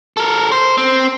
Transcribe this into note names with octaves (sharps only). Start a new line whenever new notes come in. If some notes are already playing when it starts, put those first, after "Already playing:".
A4 A#4
C5
C4